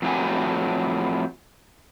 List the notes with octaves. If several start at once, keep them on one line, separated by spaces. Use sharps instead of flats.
F2 A2 E3 F#3 F#4 G#5